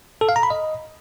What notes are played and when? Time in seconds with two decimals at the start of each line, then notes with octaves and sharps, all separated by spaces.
0.21 A4
0.29 F5
0.36 A#5
0.43 B5
0.50 D#5